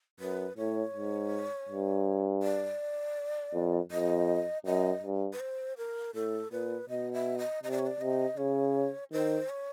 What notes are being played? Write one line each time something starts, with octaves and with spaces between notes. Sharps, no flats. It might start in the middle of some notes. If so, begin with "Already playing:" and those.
F#2 B4
A2 C#5
G#2
G2
D5
F2
F2 D#5
F#2 D#5
G2
B4
C5
A#4
A2 A4
A#2 B4
B2 D#5
E5
D#5
C3 D#5
D5
C#5
D5
C3 D#5
C#3 C#5
D#3 C5
C#5